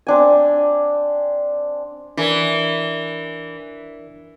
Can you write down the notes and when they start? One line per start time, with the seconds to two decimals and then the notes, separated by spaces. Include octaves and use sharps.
0.07 C4 D4 G#5
2.17 E3 D4 A#4 D5